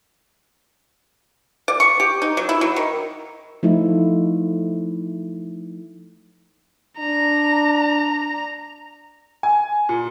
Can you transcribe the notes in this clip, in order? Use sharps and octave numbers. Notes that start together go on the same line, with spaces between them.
D5
C#6
G4
D#4
F#3
E4
F#3
D#3
F3 A3 D#4 E4
D4 A#5
G#5
A#2